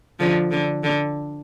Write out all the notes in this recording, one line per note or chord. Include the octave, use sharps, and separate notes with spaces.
D3 F3
D3
D3